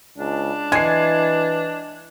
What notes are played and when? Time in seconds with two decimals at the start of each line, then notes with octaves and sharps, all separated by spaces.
0.18 C#2 D4
0.72 E3 G#3 G#6 C7